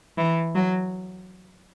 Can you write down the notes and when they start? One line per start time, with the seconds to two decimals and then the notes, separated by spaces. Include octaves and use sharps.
0.18 E3
0.55 F#3